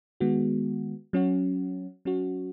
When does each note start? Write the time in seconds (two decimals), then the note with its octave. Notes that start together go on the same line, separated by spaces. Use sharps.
0.20 D#3 G#3 B3 F#4
1.13 F#3 C#4 F#4
2.05 F#3 C#4 F#4